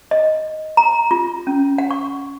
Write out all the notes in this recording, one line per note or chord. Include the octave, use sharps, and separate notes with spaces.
D#5
A#5
F4
C#4
F#5
C#6